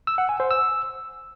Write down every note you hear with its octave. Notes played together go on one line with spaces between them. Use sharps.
E6
F#5
G#5
C5
E6